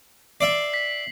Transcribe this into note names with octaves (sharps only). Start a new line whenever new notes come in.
D5 E5 C7 F#7
B6